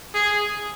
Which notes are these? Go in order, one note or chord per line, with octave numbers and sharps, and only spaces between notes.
G#4